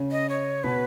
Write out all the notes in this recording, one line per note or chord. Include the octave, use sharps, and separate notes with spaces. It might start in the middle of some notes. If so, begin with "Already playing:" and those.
Already playing: C#3 C#4
D#5
C#5
B2 B3 B4